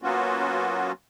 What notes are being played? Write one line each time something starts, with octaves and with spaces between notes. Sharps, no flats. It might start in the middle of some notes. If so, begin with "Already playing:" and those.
F#3 A#3 B3 C#4 F4 F#4